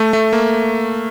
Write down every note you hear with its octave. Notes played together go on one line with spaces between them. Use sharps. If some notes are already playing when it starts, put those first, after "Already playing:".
Already playing: A3
A3
A#3